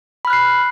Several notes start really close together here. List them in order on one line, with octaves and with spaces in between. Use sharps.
B5 F6 F#6 C7